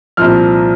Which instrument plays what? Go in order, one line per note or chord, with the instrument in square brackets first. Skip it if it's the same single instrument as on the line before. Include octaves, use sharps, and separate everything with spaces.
[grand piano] C2 A#2 F3 F6